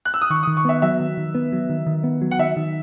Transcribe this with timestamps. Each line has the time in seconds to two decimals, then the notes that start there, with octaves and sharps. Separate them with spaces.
0.05 F#6
0.14 E6
0.21 D#6
0.30 D#3 C#6
0.43 D#6
0.47 D#3
0.57 C#6
0.65 B3 E5
0.82 F#3 E5
1.00 D#3
1.17 D#3
1.35 B3
1.52 F#3
1.69 D#3
1.86 D#3
2.04 B3
2.22 F#3
2.31 F#5
2.39 D#3 E5
2.56 D#3